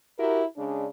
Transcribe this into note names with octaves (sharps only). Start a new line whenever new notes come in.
E4 F#4 G4 A#4
C#3 G#3 D4